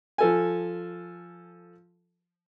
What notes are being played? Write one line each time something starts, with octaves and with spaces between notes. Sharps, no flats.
F3 A4 G#5